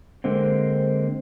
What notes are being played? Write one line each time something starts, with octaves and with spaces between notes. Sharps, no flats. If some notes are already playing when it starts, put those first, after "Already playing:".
D3 G#3 A#3 C4